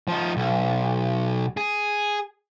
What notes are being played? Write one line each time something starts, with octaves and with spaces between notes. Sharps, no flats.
F3 D#4
B1
G#4